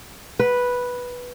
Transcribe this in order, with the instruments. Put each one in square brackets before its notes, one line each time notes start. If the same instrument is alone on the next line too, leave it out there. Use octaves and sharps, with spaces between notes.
[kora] B4